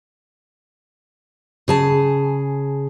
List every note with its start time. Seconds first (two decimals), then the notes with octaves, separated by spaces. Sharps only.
1.68 C#3 G#4 A5